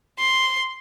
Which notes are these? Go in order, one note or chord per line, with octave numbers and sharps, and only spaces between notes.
C6